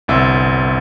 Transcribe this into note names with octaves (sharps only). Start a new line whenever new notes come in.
G1 C2 E5 E6